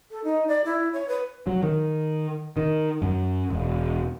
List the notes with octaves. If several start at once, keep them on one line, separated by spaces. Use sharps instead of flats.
A4
D#4
D5
E4
C#5
B4
F#3
D#3
D#3
F#2
E1